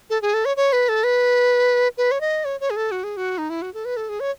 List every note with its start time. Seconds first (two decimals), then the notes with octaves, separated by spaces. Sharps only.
0.10 A4
0.22 G#4
0.34 A4
0.45 C#5
0.57 C#5
0.73 B4
0.89 A4
1.04 B4
1.98 B4
2.11 C#5
2.21 D#5
2.45 C#5
2.60 C#5
2.70 G#4
2.76 A4
2.91 F#4
3.04 G#4
3.17 F#4
3.38 D#4
3.50 E4
3.62 F#4
3.74 A4
3.85 B4
3.97 A4
4.09 G#4
4.20 C#5